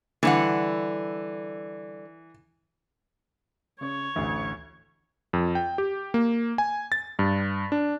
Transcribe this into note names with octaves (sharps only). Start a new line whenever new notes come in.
D3 E3 G3 F#5
C#3 C#5
A1 D2
F2
G5
G4
A#3
G#5
A6
G2
D4